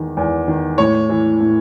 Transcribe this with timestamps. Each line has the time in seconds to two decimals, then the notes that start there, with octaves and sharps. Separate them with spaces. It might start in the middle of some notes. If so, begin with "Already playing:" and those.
Already playing: E2 D#3
0.17 E2
0.48 D#3
0.78 A2 C#5
1.09 E3
1.41 A2